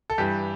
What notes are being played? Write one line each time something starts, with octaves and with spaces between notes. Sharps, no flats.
A4
G2 E3 G3 G4